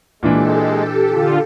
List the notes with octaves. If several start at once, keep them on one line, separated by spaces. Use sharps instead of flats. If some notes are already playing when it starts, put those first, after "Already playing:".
A#2 E3 G#3 D4 G4 A4
D3 F4